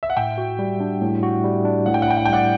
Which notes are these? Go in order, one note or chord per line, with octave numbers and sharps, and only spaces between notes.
E5
F#5
A2 E5 G5
F#4
G3
D4
A2
F#4
G3
D4
A2 F#5
G5
F#5
E4 G5
F#5
G5
G3 D5 F#5